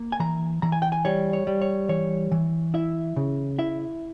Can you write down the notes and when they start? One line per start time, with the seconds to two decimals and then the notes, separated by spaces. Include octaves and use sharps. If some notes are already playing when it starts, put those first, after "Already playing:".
Already playing: A#3
0.12 G#5
0.20 E3 A#5
0.62 E3 A#5
0.72 G#5
0.82 G5
0.92 G#5
1.05 G3 C#5
1.33 C#5
1.47 G3
1.62 C#5
1.89 E3 C#5
2.32 E3
2.74 E4 E5
3.16 C#3
3.59 E4 E5